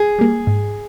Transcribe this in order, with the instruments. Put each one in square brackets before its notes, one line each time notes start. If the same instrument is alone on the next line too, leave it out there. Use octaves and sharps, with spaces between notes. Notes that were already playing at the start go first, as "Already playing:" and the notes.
Already playing: [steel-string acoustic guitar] G#4
[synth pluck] G3 A#3
G#2